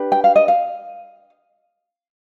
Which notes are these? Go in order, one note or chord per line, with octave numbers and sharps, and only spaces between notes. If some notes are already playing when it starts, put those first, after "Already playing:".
Already playing: D4 G4 B4
G5
F5
D#5
F5